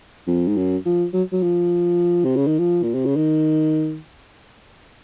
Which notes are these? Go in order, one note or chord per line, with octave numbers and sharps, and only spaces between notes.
F2
G#2
F#2
F3
F#3
F#3
F3
C3
C#3
D#3
F3
A#2
C3
C#3
D#3